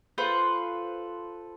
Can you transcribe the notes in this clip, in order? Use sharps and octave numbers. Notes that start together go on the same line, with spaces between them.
F4 A4 B4 C5